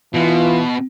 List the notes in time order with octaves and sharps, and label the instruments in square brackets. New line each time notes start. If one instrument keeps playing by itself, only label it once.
[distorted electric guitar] B2 [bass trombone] E3 [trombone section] F4